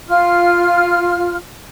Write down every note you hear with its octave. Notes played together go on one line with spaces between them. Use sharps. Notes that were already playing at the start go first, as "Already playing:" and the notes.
F4 F6